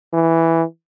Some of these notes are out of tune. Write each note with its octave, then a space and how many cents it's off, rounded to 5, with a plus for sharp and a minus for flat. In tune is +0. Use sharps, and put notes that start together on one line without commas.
E3 +0